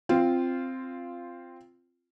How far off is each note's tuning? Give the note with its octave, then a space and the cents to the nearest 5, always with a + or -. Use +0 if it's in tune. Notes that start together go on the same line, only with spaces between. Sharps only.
C4 +0 F4 -10